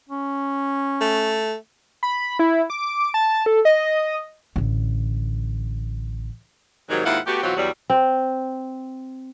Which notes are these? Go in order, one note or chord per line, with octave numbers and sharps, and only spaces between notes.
C#4
A3
B5
E4
D6
A5
A4
D#5
A1 D3
G#2 C3 D#3 F#3
D#2 G#2 E4 F4 F#5
A3 B3 F#4 G4
B2 E3 F#3 C4 F4 F#4
E2 F#3 G3
C4